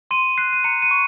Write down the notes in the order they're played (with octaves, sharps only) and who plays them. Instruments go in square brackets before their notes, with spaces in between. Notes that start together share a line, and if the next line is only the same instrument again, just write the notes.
[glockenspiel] C6 D#7
F#6 C7
D#7
A#5 C#7
D#7
C#6